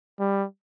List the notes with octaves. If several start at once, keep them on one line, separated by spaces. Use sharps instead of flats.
G3